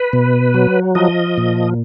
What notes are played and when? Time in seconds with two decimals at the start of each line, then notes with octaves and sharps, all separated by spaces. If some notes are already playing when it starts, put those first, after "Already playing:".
Already playing: B4
0.13 B2
0.54 F#3
0.95 F3 D#5
1.38 A#2